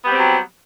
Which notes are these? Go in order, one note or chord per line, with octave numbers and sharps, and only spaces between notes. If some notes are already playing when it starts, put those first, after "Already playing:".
F#3 G3 B3 C4 G4